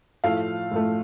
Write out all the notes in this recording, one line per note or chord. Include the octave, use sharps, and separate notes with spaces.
A2 F3 A3 F5
A2 F3 A3